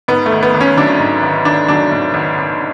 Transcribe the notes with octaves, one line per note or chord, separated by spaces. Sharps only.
G#2 B3
A3
G#1
B3
G#1
C#4
F#3 D4
G#2
G#1
G#1 D4
F#3 D4
G#2
G#1
G#1